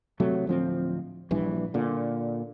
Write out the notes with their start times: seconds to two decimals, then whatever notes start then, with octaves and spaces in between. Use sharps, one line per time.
0.20 C3 F#3 A3
0.47 D1 F3 C4
1.31 A#1 G2 E3
1.74 A#2 D3